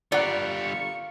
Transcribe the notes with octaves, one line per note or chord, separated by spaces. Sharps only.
D3 G3 F4 A#4 D5 F#5 C#6